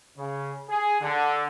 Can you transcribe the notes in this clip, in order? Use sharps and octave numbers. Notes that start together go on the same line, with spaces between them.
C#3
G#4
D3